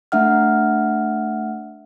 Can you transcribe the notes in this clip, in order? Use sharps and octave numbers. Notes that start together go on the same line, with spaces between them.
A3 D4 E5 F#5 F6